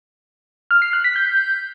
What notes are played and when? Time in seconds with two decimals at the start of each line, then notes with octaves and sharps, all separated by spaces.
0.71 F6
0.82 C7
0.93 F#6
1.04 B6
1.16 G6